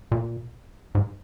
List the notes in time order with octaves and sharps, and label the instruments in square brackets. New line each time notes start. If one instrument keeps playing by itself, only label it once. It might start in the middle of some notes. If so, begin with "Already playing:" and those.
[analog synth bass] A#2
G#2